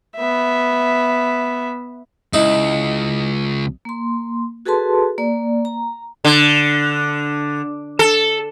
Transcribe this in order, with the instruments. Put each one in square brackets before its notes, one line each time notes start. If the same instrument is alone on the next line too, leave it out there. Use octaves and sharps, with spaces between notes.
[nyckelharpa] B3 E5
[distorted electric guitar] C#2 [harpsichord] D#4 E4
[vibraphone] A#3 C6
F#4 G#4 A4 B4 A5 C6
A#3 D5
A#5
[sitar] D3
A4